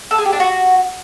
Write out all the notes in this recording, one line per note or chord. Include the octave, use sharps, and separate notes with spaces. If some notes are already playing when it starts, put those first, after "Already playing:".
A4
G#4
G4
D4
F#4